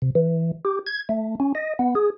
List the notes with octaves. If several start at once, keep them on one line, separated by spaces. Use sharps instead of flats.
C3
E3
G4
G#6
A3
C#4
D#5
B3
G#4